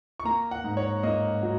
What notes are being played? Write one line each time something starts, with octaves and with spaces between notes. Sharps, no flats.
C#6
A#3 A#5
F#5
G#2
C#5
A#3 D#5
F#3